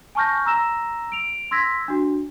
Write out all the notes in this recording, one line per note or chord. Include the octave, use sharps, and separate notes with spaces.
G#5 A5 C#6 F6 G6 A#6
A#5 E6 A#6 E7
D7 F7
C6 E6 G#6 A#6 B6
D4 F#4